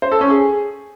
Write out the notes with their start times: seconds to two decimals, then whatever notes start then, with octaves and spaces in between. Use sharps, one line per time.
0.02 C5
0.12 A4
0.21 C#4
0.30 G#4